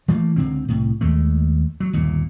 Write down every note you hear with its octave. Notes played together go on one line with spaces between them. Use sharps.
E3 A3 A#3
C#2 D3 C4
C2 A2
D#2 G#3 A3
F#3
G1 D#2 A#2